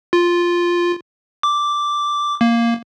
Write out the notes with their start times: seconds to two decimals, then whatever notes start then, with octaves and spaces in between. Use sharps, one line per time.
0.13 F4
1.43 D6
2.41 A#3